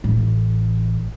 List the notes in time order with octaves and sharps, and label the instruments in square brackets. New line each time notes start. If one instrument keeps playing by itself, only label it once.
[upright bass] A1